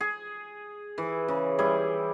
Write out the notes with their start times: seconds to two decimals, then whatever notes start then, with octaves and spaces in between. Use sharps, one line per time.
0.01 G#4
0.98 E3
1.28 C#3
1.59 G3 E4 G#4